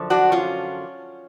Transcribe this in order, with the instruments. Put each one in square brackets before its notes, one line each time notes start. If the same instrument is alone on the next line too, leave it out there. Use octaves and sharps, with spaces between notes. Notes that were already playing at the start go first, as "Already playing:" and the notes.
Already playing: [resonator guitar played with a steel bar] F#2 D3 F3
D4 F#4
C#4 F4